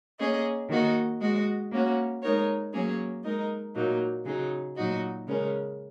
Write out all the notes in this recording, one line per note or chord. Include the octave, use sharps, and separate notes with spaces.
A#3 C#4 G#4 D#5
D#3 A#3 F#4 D#5
G#3 F#4 D#5
A#3 C#4 F#4
G#3 D#4 A#4 C#5
F#3 A#3 C#4 G#4 C#5
G#3 D#4 A#4 D#5
A#2 F#3 A#3 D#4
C#3 F#3 D#4 G#4
A#2 F#3 D#4 F#4 D#5
C#3 G#3 C#4 A#4